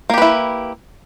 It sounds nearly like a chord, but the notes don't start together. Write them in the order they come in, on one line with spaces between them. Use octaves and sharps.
A#3 G4 B4 E4